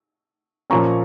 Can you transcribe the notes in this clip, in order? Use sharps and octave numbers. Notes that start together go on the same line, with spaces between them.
A#2 F3 A#3 C#4 A#5 C#6